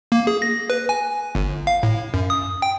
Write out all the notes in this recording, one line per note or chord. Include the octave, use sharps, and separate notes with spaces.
A#3
G#4
A#6
B4
G#5
G1
F5
A2
F#2
D#6
G5